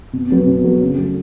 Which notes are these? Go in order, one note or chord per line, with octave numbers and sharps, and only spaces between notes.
B2
F#3 B3
B2
F#3 B3
C#3
F#3 A3